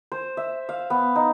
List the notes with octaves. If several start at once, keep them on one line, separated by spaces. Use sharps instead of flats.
C5
E5
F5
B3
D#4